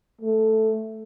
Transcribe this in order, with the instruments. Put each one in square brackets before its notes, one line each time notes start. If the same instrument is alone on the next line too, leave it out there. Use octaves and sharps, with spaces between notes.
[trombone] A3